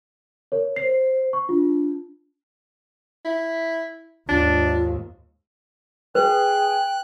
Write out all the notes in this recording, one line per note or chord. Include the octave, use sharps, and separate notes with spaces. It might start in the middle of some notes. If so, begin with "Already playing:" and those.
A#4 C#5
C5 C7
C#6
D4 F4
E4
D#2 G#2 D4 F4
G#4 B4 G5 F#6